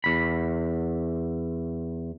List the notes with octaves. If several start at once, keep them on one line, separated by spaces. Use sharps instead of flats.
E2 B5